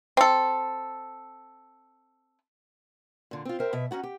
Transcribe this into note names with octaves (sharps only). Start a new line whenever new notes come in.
C4 A4
A#2 D3
C4 F4
A#4 C5 E5 G5
B2 E5
C#4 D#4 F#4 F#5
G4